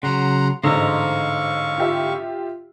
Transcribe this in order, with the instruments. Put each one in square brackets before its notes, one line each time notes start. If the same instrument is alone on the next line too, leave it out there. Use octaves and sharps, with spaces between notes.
[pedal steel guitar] C#3 F#3 [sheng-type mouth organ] F#5 A#5 C6
[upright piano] A1 G#2 D3 [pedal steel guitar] C5 D#5 A#5 [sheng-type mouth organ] F5 C#6
[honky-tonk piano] F4 G4 E5